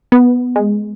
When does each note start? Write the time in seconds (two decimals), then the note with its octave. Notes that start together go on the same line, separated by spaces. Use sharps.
0.12 B3
0.56 G#3